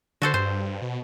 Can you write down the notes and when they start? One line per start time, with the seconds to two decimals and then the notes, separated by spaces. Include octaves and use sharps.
0.22 D3 F#4 A4 C5
0.34 G2 C5
0.82 B2